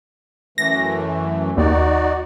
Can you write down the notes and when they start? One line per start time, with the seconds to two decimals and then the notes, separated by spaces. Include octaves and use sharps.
0.58 F#2 E3 A3 A#6
1.57 D#2 D#4 F#4 D5